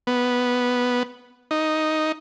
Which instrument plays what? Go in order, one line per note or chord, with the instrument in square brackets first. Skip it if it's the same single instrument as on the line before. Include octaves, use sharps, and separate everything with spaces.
[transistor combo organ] B3
D#4